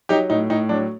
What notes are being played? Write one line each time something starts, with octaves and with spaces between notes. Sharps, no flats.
F#3 D#4 G4
A2 D#4
A2 D#4
F#3 D4